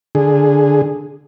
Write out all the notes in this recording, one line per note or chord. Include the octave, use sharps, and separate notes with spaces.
D3 G#4